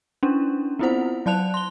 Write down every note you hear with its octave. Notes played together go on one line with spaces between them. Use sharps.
C#4 D4 E4
B3 C4 E4 F4 C5 F#5
F#3 D5 A5 F#6 F7
C6 G7